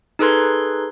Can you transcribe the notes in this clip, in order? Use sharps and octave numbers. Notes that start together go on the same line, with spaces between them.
D#4 G#4 A4 B4 C6 G#6